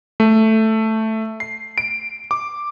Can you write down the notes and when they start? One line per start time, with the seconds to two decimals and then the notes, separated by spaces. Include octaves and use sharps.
0.20 A3
1.40 C7
1.78 D7
2.31 D6